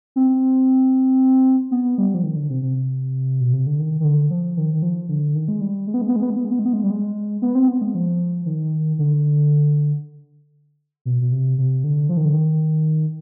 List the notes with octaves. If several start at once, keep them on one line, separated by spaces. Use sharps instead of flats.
C4
B3
G3
F3
D#3
D3
C3
C3
B2
C3
D3
D#3
D#3
D3
F3
D#3
D#3
F3
D3
D#3
G#3
G3
G#3
B3
G#3
B3
G#3
B3
G#3
B3
G#3
B3
G#3
B3
G#3
G3
G#3
B3
C4
B3
G#3
F3
D#3
D3
B2
B2
C3
C3
D3
F3
D#3
D3
D#3